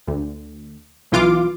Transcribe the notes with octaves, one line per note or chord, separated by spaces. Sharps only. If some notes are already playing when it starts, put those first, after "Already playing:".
D2
B1 E3 F4 D6